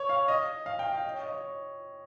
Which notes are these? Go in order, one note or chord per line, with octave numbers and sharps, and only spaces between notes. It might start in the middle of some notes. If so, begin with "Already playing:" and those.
Already playing: C#5
F5
D#5
F5
G5
F5
D#5
C#5
D#5
C#5